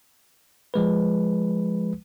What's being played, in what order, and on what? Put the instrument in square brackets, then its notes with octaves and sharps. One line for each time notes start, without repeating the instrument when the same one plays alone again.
[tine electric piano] F3 G#3 B4